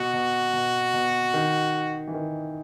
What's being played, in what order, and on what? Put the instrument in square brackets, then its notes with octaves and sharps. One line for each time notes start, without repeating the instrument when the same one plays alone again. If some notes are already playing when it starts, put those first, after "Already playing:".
Already playing: [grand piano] B2 [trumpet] F#4
[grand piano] B2
B2
B2
D#3
E3
D#3